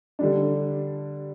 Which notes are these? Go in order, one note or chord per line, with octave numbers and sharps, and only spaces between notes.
D3 G3 D4